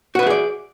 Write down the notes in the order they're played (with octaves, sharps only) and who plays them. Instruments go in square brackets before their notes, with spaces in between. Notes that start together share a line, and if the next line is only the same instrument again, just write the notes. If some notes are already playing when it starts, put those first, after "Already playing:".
[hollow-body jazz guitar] F#4
B4
E5
G#4
D5